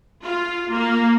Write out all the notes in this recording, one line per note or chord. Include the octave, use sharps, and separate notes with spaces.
F4
A#3